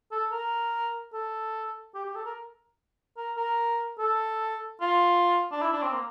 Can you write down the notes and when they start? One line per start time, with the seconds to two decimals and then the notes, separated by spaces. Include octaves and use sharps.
0.12 A4
0.31 A#4
1.13 A4
1.95 G4
2.05 G4
2.15 A4
2.26 A#4
3.17 A#4
3.37 A#4
3.99 A4
4.81 F4
5.52 D4
5.62 E4
5.73 D4
5.83 C4
5.93 A#3